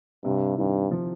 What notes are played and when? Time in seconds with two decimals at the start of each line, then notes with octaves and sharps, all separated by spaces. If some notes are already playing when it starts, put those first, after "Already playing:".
0.25 G2 C3
0.58 G2 D#3
0.91 F3